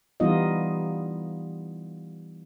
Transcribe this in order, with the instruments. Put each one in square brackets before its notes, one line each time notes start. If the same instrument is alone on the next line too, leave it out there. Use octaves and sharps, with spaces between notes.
[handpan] E3 G3 B3 D#4 F4 D#5